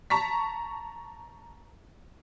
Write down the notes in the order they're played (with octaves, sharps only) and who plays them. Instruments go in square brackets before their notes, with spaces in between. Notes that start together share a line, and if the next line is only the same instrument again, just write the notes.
[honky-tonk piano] A5 A#5 C#6 B6